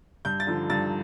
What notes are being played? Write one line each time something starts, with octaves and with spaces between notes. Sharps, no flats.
G2 G6
A6
D3 F3
G2 A6